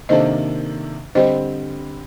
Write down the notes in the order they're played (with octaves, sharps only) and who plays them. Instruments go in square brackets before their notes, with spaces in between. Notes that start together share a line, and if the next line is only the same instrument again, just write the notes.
[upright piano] C3 D#3 A#3 D4 A4 [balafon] C5 D#5
[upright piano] D3 G3 C4 G4 [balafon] C5 D#5